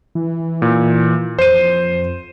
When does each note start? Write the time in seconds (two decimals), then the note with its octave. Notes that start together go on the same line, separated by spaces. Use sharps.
0.15 E3
0.62 A#2
1.39 F2 C5 D#7